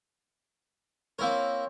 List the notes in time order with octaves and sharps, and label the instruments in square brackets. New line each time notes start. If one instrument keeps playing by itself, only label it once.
[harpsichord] A#3 E4 A#4 [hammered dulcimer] C4 C#5